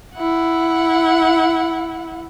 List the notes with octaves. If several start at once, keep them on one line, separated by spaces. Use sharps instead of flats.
E4 F#5